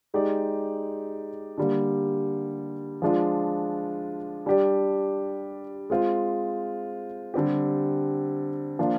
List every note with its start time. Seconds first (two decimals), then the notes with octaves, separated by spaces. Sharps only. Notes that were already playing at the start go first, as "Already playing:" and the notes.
0.14 G#3 D#4 G4 D5
1.58 D3 G3 A#3
3.02 F3 G#3 D4 F4
4.46 G3 D4 G4 D5
5.90 G#3 C4 F4 C5
7.34 D3 G3 C4 G4
8.79 F3 A#3 D4 F4